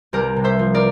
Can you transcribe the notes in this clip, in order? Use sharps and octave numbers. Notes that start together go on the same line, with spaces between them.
C2 G4 A#4
C3
C5 E5
F3
A#4 D5